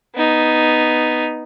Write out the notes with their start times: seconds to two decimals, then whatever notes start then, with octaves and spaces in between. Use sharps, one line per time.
0.15 B3 D#4